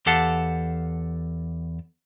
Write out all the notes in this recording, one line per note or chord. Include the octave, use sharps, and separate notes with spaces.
E2 G4 A4 F5 F#5 A5